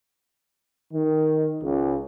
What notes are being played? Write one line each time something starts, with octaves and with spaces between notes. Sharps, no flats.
D#3
C#2